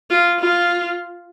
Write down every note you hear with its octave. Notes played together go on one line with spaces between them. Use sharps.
F4
F4